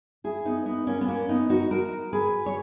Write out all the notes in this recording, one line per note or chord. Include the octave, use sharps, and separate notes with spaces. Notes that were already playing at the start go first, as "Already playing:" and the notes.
E4 G#4
B3 D#4
B3 D#4
A#3 C#4
B3
A#3 C#4
B3 D#4
D#4 F#4
F#4 A#4
G#4 B4
C#5